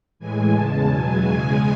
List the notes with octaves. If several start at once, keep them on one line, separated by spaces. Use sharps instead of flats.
A2 E3 G#3 G#5
E2 C#3 G#3 A5
E2 B2 F#3 G#5
E2 C#3 G#3 G#5